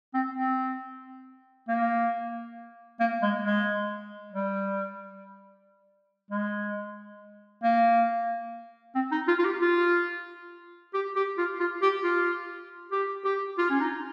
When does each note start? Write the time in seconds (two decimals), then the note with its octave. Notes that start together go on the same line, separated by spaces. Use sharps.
0.14 C4
0.36 C4
1.68 A#3
3.00 A#3
3.22 G#3
3.44 G#3
4.32 G3
6.31 G#3
7.63 A#3
8.95 C4
9.12 D#4
9.28 F4
9.39 F4
9.45 G4
9.61 F4
10.94 G4
11.16 G4
11.38 F4
11.60 F4
11.82 G4
12.04 F4
12.92 G4
13.24 G4
13.58 F4
13.70 C#4
13.80 D#4